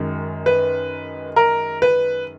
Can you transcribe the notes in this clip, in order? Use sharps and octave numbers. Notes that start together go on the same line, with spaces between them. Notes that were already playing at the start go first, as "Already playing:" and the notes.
Already playing: F#2 D#3 G#3
B4
A#4
B4